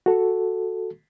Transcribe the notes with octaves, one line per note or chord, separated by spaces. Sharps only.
F#4 A4